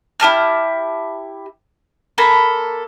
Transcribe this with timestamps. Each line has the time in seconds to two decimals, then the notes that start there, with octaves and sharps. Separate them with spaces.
0.20 E4 G4 A5 F6
2.18 A#3 A4 A#5 B5